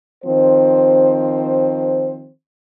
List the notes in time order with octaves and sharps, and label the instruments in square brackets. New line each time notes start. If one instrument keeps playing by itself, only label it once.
[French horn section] D#3 F3 C4 C5